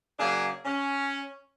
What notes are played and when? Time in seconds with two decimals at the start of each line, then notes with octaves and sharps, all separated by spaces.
0.18 C#3 F#3 A#3 D4 G#4
0.65 C#4